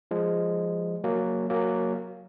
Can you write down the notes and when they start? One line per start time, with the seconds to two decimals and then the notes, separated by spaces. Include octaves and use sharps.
0.11 F3 G#3
1.04 F#3 A#3
1.50 F#3 A#3